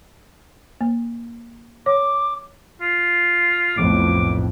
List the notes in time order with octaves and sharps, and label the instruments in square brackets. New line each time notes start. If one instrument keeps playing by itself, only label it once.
[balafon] A#3
[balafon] C#5 [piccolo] D6
[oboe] F4
[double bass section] B1 F2 A2 [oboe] D6